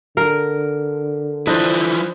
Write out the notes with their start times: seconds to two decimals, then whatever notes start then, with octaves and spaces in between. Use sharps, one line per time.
0.17 D3 A#4
1.47 E3 F3 D4 E4 C5 D#5